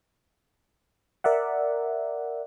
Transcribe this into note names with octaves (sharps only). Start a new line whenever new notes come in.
A#4 D5 E5 F#5